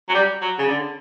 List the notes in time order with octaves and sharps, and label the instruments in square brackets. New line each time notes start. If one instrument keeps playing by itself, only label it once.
[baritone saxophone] F#3
G3
F#3
C#3
D3